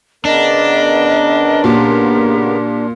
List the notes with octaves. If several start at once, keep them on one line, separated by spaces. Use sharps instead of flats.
C#3 B3 D4 A#4 D#5
A#2 G4